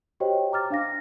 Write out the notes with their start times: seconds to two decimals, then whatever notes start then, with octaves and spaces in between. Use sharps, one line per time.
0.20 F#4 G4 C5 C#5 D#5 G5
0.52 A#5 D6 F6 A6
0.70 D4 F5 A#6